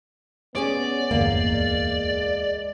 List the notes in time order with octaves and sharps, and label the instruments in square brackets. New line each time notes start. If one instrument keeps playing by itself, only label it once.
[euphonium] B3 [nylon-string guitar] C#4 G#4 C#5 [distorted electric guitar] D5
[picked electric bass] D1 G1 E2 [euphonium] G#3 [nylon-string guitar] A#3